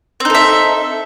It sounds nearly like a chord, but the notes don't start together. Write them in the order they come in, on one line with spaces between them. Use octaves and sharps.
C4 D#4 A4 E5